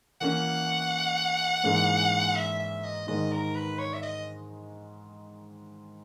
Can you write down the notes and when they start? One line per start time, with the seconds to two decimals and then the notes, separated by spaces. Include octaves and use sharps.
0.21 E3 A#3 C#4 F#5
1.64 G#2 E3 A#3 C#4 G#4
2.36 E5
2.60 E5
2.84 D#5
3.07 G#2 D#3 G#3 D#4 D#5
3.32 A#4
3.55 B4
3.79 C#5
3.93 E5
4.03 D#5